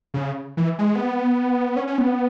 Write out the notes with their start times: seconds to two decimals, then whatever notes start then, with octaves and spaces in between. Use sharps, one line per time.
0.14 C#3
0.57 E3
0.79 G#3
0.95 B3
1.76 C#4
1.87 C#4
1.98 B3